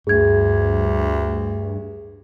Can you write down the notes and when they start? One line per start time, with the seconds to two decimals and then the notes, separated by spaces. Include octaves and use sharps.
0.07 D2 G2 G#4 G#6